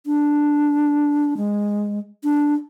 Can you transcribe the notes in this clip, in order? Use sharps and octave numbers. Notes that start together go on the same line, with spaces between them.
D4
G#3
D4